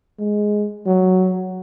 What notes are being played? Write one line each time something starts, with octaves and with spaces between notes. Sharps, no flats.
G#3
F#3